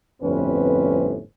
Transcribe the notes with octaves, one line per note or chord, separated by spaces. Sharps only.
G1 F2 A2 C4 C#4 B4